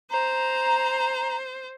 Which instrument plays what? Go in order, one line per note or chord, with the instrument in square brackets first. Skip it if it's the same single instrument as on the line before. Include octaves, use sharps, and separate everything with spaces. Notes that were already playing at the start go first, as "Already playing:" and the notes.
[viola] C5 [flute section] A#5